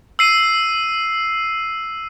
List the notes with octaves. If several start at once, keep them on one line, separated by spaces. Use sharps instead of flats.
E6 C7 D#7